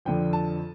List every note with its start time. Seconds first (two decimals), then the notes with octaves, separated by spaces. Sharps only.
0.05 F2 D3 F3 G5
0.33 A5